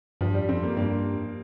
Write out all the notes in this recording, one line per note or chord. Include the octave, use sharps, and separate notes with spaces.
G2 F3
G3
F2 C4
A#3
G2 A#3